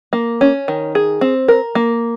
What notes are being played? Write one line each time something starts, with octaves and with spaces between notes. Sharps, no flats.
A#3
C#4
D#3
G#4
C4
A#4
A#3